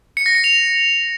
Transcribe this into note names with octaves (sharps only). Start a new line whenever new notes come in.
C#7
A#6
C#7
F7